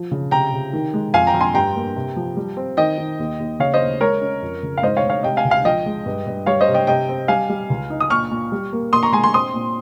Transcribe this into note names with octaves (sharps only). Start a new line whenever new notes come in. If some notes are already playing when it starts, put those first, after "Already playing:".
Already playing: F3
C#3
C3 G5 A#5
C3
D#3
G#3
F2 F5 G#5
G5 A#5
F2
G#5 C6
G2 G5 A#5
A#3
C3
F3
G3
C4
D#3 D#5 G5
D#3
D#2
D#2
C#3 C#5 F5
C5 D#5
D#2
G#3 A#4 C#5
C#4
F2
C#3
F5
G#2 C5 D#5
C#5 F5
G#2
C#5 F5
C3 D#5 G5
F5 G#5
C#2
F5 G#5
F3 D#5 G5
G#3
G2
G2
G3 C#5 F5
C5 D#5
C3
D#5 G5
C3 D#5 G5
C4
G3 F5 G#5
G3
C#2
D#4
D#6
A#2 C#6 F6
A#2
G3
A#3
A#2 C6 D#6
A#5 C#6
G#3 G#5 C6
G#5 C6
C4 C6 D#6
A#2